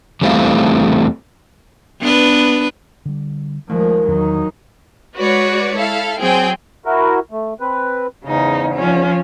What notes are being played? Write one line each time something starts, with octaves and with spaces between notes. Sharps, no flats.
E2 G3 A3 C4 E4 F5
B3 D4 B4
D3 G3
D#2 F3 G#3 A3
E2 D#3 F#3 D#4
G#3 F#4 B4 C#5 D5
E4 A4 F5
F#3 C4 G#4 G5 G#5
E4 F#4 A#4
A3
C4 B4
E2 G#2 C#3 D#4
F3 C#4